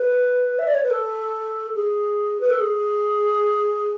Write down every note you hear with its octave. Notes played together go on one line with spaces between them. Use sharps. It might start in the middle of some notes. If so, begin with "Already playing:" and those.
Already playing: B4
E5
D5
C#5
B4
A4
G#4
B4
A4
G#4